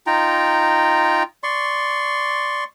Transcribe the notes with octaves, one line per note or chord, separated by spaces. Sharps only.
D#4 F4 G5 A#5
D5 C6 C#6